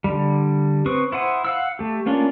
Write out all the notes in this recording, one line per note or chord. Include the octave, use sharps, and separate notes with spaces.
D3 G3
C4 B4 C#6 D#6
E4 C5 F#5 D#6
F5 F#5 E6
A3 G4
A3 A#3 C#4 D4 F4